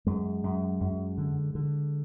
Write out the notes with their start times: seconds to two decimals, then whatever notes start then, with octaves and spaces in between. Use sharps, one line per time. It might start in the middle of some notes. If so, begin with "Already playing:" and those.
0.07 F#2 G#3
0.44 F#2
0.81 F#2
1.18 D3
1.55 D3